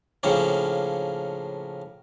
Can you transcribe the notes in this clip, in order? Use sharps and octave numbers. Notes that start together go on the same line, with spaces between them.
A2 C#3 F3 A#3 C#4 D4